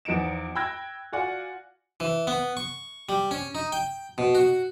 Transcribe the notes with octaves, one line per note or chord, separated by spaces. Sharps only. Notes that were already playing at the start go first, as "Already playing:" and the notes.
E2 F3 D#4 C#7 D7 E7
G5 B5 E6 F#6 G#6 A#6
F4 F#4 D5 F#5 G#5
E3
B3
C#6
G3
C#4
D#4
G5
B2
F#4